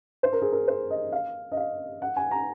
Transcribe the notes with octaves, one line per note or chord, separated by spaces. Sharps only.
C5
A#4
G#4
A#4
C5
D#5
F5
D#5
F5
F#5
G#5
A#5